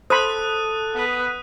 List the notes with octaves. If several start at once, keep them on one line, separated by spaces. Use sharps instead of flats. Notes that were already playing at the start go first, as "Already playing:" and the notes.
A4 C5 B5 D#6 F#6 D#7
B3 B4